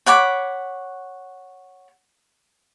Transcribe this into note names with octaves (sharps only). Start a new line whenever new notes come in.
C#5 F#5 B5 D6